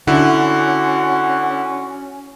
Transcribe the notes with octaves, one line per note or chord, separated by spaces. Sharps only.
D3 C#4 E4 F#4